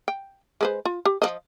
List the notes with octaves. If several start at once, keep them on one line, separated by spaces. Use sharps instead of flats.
G5
G#3 B4 C5
F4
G4
F3 B4 D#5